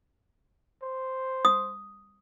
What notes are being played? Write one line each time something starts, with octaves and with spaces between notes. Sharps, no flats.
C5
D#6